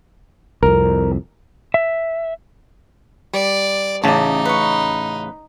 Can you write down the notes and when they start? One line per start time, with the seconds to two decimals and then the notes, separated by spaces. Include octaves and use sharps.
0.63 C2 F2 A#4
1.74 E5
3.34 G3 D5
4.04 A1 C#3 D#4 D5 A5
4.45 B4 C#6